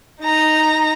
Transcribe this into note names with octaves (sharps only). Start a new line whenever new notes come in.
D#4 A#5